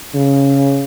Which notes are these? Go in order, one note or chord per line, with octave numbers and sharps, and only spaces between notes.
C#3